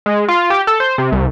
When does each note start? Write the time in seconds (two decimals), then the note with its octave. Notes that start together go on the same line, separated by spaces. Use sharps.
0.06 G#3
0.28 F4
0.50 G4
0.67 A4
0.80 C5
0.98 C3
1.12 C2